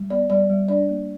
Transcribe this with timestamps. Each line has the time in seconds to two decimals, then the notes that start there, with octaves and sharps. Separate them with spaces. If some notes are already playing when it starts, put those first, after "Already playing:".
Already playing: G3
0.10 B3 D5
0.30 G3 D5
0.50 G3
0.69 D4 D5
0.89 A#3